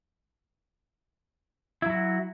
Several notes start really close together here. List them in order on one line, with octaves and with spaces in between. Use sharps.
E4 F#3 F#4